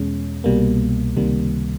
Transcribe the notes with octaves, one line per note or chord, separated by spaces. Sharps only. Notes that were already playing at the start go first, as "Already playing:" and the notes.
Already playing: E2 B2 G#3 C#4
C2 B2 G3 A#3
C#2 C3 D#3 G3 A#3